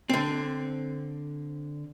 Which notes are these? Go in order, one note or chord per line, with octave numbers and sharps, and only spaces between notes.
D3 C4